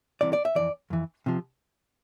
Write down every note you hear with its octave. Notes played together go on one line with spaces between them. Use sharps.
C2 C3 E3 D5
D5
E5
F2 E3 D5
F2 E3
C3 F3